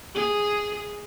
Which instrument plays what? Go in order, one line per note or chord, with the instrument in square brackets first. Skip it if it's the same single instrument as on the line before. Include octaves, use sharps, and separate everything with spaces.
[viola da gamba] G#4